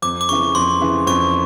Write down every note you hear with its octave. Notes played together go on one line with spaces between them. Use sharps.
F2 D6
D6
C#3 E3 C#6
F2 C6
C#3 E3
F2 C#6